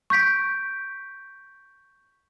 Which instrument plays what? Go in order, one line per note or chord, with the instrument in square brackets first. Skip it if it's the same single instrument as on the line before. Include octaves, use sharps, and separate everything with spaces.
[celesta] C#6 G6 B6 D7